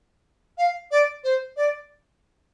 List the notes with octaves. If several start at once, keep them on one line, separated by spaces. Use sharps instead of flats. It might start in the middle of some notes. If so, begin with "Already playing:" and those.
F5
D5
C5
D5